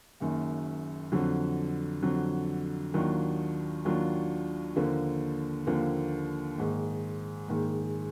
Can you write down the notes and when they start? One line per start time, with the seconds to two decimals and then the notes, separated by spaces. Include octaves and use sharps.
0.20 F#1 F#2 D#3
1.12 F2 D3 F#3
2.03 F2 D3 F#3
2.94 D#2 D#3 F#3 D4 F4
3.85 D#2 D#3 F#3 D4 F4
4.76 D#2 D3 F3 A#3
5.67 D#2 D3 F3 A#3
6.58 A#1 G#2 D#3
7.48 A#1 G#2 D#3